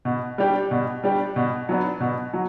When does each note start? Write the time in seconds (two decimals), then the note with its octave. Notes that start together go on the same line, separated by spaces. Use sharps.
0.05 B2
0.38 G3 D4 G4
0.71 B2
1.04 G3 D4 G4
1.36 B2
1.69 F#3 B3 D4
2.00 B2
2.33 F#3